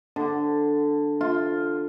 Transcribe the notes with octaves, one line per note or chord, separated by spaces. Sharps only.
D3
F4